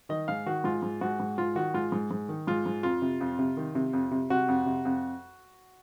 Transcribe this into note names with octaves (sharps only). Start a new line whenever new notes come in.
D#3 D#5
G#2 F5
D#3 F#4
G#2 F4
G#2
G#2 F#4
G#2
G#2 F4
D#3 F#4
G#2 F4
G#2
G#2
D#3
G#2 F4
G#2
F2 F4
C3
F2
C3
D#3
C3
F2
C3
C3 F#4
F2
C3
F2